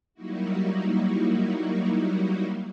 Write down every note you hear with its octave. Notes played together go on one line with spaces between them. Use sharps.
F#3 G3 A#3 D#4 E4 F#4